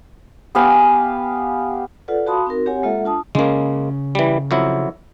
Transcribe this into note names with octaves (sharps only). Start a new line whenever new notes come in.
B3 G4 F5 G#5
F4 A4 B4 D5 F#5
F#4 F5 A5 B5 C6 D#6
C4 D#4 F#4 A#4
C4 G4 C#5 F#5 G#5
G#3 A#3 F4 A4 E5 F#5
D4 F4 A5 D#6
C#3 G#3 A#3 C#4
E3 G3
F2 F#3 E4